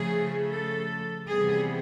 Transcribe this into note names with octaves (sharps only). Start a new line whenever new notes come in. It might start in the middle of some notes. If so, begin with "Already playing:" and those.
Already playing: C#3 F3 A3 G#4
A4
C3 E3 G3 B3 G#4